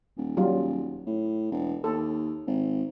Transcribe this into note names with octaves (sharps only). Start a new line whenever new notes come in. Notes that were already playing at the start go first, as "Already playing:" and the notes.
D#1
F#3 G3 F4
A2
E1
D#2 A4
G#1